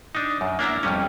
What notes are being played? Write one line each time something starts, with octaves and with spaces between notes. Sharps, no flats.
D4 D#4
F#2
A#3 D4 E4 A#5
F2 G3 C#4